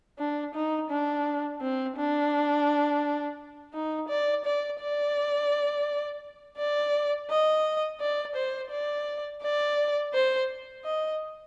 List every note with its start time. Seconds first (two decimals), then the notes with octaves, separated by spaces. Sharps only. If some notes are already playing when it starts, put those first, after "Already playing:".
0.19 D4
0.54 D#4
0.90 D4
1.61 C4
1.97 D4
3.74 D#4
4.09 D5
4.45 D5
4.80 D5
6.58 D5
7.30 D#5
8.00 D5
8.36 C5
8.71 D5
9.42 D5
10.14 C5
10.85 D#5